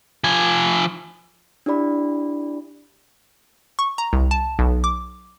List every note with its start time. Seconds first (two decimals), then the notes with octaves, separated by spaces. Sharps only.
0.24 F3 G#5
1.66 D4 E4 G4 D5 B5
3.79 C#6
3.98 A#5
4.13 C2
4.31 A5
4.59 B1
4.84 D6